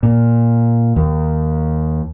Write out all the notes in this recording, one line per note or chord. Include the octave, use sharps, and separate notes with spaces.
A#2
D#2